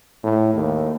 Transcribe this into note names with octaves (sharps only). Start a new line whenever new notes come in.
A2
D#2